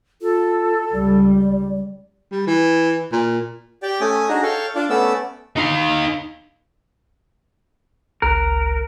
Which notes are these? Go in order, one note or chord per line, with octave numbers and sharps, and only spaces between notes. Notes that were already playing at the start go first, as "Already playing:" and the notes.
F4 A4
C#2 G3 D5
G3
E3
A#2
G4 D5 G5
A3 C#4 G#5 D#6
D4 D#4 F#4 G#4 A#5
A4 C#5 F5 G5
D4 F4 D5
A3 B3 C#4 D5 E6
D#4 F5
G1 C#2 A#4 F#6